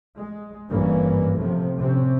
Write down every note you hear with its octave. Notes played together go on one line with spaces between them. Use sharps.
G#3
G#1 G2 E3 A#3 C#4
A2 C3 F3
C3 C4 C#4